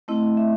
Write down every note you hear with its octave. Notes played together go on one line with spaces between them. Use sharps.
A3 C4 E4 D#5
E5